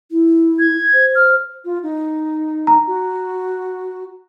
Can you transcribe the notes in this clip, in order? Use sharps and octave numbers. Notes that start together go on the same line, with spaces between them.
E4
G#6
C5
F6
F4
D#4
A#5
F#4